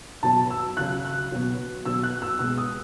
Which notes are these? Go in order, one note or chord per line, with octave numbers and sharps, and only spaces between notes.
B2 F#3 A5
E6
C#3 F#3 F#6
F#6
B2 F#3
B2 F#3 E6
F#6
E6
B2 G#3 E6
D#6